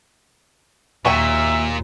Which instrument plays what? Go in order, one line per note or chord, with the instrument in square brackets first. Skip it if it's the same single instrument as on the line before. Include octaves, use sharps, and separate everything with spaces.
[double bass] D#2 [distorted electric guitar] A#2 [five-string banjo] F#3 C#5 G5 [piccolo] E5